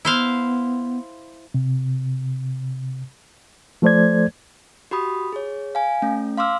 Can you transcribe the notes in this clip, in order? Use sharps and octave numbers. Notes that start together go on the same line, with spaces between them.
B3 E4 C5 F5
C3
F3 A3 A4 C5 D5 G#6
F#4 G4 B5 D#6
G#4 C#5
F5 G#5
A3 C#4
F5 C6 D6 E6 F6